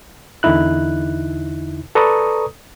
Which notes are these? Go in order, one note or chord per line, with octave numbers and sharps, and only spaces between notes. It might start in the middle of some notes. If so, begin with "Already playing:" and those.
E2 D3 D#4 E4 F#6
A4 B4 D5 A#5 C#6 D#6